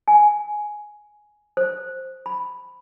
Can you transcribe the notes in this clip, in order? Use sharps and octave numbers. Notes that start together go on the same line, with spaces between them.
G#5
C5
B5